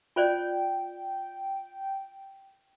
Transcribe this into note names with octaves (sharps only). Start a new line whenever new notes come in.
F4 C5 D5 G5